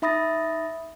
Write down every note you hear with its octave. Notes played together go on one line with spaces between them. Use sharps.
D#4 E5 B5 D#6 A6 A#6